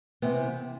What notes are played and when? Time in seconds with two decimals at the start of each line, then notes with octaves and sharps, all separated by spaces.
0.22 C3 E3 B3